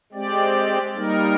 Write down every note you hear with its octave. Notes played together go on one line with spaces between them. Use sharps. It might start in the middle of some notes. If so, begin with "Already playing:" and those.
G#3 C4 G4 D5
G3 A#3 D#4 A#4